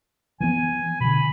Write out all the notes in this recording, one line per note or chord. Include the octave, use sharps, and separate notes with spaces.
E3 F3 B3 G#5
B2 D3 B5